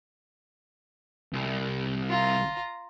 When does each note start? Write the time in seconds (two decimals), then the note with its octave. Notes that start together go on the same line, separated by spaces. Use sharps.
1.33 C2
2.09 F4 A#5